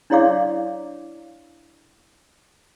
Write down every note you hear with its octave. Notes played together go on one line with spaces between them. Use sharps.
D4 E4 C#5 D5 F5 D6